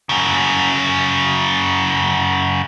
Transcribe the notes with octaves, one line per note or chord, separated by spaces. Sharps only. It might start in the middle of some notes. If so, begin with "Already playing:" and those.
F#2 C#3